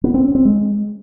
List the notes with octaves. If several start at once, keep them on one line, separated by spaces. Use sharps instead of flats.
B3
C4
C#4
C4
G#3